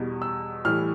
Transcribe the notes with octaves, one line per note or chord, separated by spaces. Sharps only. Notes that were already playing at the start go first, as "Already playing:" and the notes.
Already playing: E2 B2 G3
E6
A2 E3 G3 F6